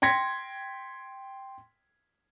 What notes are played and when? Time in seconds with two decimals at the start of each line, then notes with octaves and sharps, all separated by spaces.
0.02 G5 C6 G#6 A#6 B6 C#7